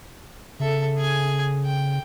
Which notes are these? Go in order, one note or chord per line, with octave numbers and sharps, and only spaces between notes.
C#3 A4 E5
G#4 G#5
G5